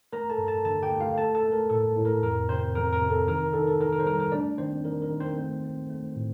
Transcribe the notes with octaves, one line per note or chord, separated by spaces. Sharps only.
A3 A#4 A#5
A4 A5
G2
A4 A5
D3 A4 A5
G4 G5
A3
F4 F5
A3 A4 A5
A4 A5
A3
A#4
A2 A4
A2
A#4
F2 A#4
C3 C4 C5
F2 A#4
A#4
C3
A4
D#3 A#4
D#3 A4
A4
D#3 A#4
A#4
C5
G3 A#4
A#4
A3 D4 D5
D#3 C4 C5
D#3 A#4
A#4
D#3
C4 C5
A3
C4
A3
A2